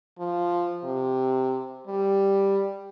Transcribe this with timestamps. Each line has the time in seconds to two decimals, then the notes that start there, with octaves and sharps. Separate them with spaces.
0.19 F3
0.84 C3
1.87 G3